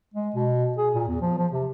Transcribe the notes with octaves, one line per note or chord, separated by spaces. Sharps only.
G#3
B2
G#4
A#2
E2
F3
F3
C3